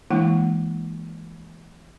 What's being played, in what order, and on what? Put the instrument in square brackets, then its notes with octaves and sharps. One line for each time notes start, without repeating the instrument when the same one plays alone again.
[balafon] E3 G#3 A#3 D4 E4 F#5